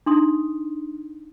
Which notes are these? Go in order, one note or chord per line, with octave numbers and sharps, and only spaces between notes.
D4 D#4 C6 D#6